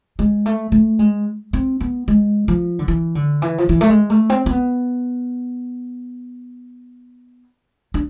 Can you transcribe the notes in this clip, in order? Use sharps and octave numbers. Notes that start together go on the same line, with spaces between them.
G#3
A3
A3
G#3
C4
B3
G#3
F3
D3
E3
D3
E3
F3
E3
A3
G#3
A3
C4
C4
B3
D4